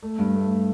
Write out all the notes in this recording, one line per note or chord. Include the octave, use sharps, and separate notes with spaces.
A3
G2
A3